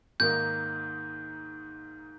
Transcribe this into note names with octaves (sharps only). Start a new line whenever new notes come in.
G#2 D#3 A#3 D#4 A#4 G6